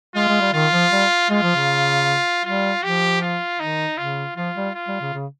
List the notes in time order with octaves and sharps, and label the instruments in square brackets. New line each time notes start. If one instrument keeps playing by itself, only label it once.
[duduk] G#3 [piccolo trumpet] F4
[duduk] G#3
G3
[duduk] D#3 [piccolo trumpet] F4
[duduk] F3
G3
[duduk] G#3 [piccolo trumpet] F4
[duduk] F3
C#3
[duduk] G3 [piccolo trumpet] F4
[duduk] F3 [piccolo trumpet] G4
[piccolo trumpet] F4
[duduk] D#3 [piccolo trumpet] D#4
[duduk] C#3 [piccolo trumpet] F4
[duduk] F3 [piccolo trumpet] F4
[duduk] G3
[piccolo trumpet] F4
[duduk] G3
C#3
C#3